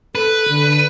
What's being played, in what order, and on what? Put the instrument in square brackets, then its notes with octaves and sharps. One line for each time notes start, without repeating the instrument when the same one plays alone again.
[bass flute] A4 [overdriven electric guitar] B4
[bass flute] D3